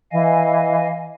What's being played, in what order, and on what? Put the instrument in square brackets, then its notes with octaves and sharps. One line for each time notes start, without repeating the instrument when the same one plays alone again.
[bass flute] E3 [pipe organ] D#5 F5 G#5